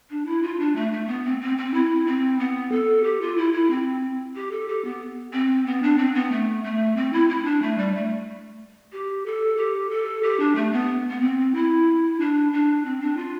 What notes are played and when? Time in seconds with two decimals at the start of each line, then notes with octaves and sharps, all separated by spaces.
0.10 D4
0.26 E4
0.43 F4
0.59 D4
0.75 A3
0.92 A3
1.07 B3
1.25 C4
1.41 C4
1.58 C4
1.74 E4
2.07 C4
2.39 B3
2.72 A4
3.04 G4
3.21 F4
3.37 E4
3.53 E4
3.70 C4
4.36 G4
4.51 A4
4.68 G4
4.84 B3
5.33 C4
5.66 B3
5.83 D4
5.98 C4
6.15 B3
6.31 A3
6.64 A3
6.96 C4
7.13 E4
7.29 E4
7.45 D4
7.62 A3
7.78 G3
7.94 A3
8.92 G4
9.26 A4
9.57 G4
9.90 A4
10.23 G4
10.40 D4
10.55 A3
10.72 B3
11.10 B3
11.21 C4
11.54 E4
12.20 D4
12.53 D4
12.85 C4
13.01 D4
13.17 F4